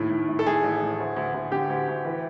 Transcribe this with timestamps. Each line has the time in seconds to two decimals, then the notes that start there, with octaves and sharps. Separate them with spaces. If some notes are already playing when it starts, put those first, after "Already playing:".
Already playing: D#2 A2
0.10 A2
0.29 A2
0.39 A4
0.46 A2 G#4
0.64 A1
0.81 A2
1.00 D2
1.16 D2
1.34 D2
1.52 D3 G4
1.70 D2
1.88 D2
2.05 E3